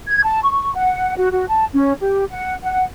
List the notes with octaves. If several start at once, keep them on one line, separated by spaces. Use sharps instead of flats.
G#6
A5
C#6
F#5
F#4
F#4
A5
C#4
G4
F#5
F#5